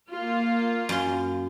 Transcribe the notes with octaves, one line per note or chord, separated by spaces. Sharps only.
A#3 F4
F#2 C6